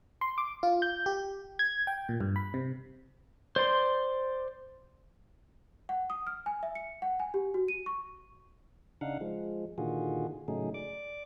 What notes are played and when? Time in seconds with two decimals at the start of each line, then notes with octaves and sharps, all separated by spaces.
0.21 C6
0.38 D6
0.63 F4
0.82 G6
1.06 G4
1.59 G#6
1.87 G5
2.09 A#2
2.21 G2
2.36 B5
2.54 C3
3.56 C5 D5 C6
5.89 F#5
6.10 D#6
6.27 F6
6.46 G#5
6.63 E5
6.75 C#7
7.02 F#5
7.20 G#5
7.34 G4
7.54 F#4
7.68 D#7
7.86 C#6
9.01 C#3 D4 D#4 F5 F#5
9.21 F3 G#3
9.78 A#2 D3 D#3 F4 F#4 G#4
10.48 A2 C#3 F#3 A3 D#4 G#4
10.74 D5 D6